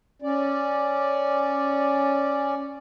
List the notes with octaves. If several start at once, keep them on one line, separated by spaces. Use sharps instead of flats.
C#4 D5